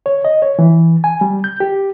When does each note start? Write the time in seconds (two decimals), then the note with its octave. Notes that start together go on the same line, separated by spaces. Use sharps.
0.06 C#5
0.25 D#5
0.42 C#5
0.59 E3
1.04 G#5
1.21 G3
1.44 G6
1.60 G4